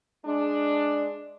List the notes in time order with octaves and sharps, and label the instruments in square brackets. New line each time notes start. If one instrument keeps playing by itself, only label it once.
[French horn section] G#3 D4